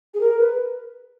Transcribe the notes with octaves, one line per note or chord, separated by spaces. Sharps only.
G#4
A#4
B4